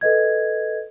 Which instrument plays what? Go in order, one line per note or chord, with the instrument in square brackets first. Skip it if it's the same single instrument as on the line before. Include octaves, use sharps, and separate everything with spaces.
[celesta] A4 B4 D#5 G#6